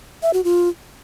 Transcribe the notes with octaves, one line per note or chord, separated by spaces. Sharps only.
E5
F#4
F4